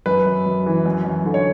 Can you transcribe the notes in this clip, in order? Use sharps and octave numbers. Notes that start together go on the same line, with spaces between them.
F#2 B4
F#2
F#2
E3
F#2
F#2
D3
C#5